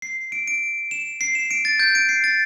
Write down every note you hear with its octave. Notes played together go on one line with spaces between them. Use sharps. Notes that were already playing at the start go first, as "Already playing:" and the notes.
C7
D7
D7
E7
C7
E7
D7
A6
G6
D7
C7
A6